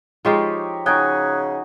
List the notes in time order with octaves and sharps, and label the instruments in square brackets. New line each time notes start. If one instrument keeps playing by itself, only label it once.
[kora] F3 G#3 F4 [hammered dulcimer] D#4 G4 C#5
[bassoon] C#3 [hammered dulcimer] D#4 F#4 G#5 [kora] G5 [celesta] D#6 F#6 G#6